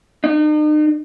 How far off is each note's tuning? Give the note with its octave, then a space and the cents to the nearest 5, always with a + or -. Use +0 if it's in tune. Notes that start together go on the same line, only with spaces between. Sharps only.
D#4 -40